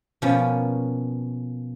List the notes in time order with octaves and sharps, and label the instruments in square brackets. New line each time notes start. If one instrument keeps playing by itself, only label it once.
[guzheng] B2 F3 A#3 B3 C#4